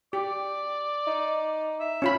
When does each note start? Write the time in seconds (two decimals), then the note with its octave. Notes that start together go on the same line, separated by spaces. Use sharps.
0.13 G4 D5
1.07 D#4
1.80 E5
2.02 C#4 F4 B5